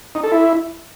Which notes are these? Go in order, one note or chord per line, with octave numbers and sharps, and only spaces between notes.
D#4
A4
E4